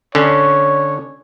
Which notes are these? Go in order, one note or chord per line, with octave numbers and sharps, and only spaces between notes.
D3 C#4 C#5